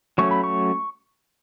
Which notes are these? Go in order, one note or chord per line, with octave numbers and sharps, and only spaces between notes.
F#3 A3 C#4 C#6
B5
C#6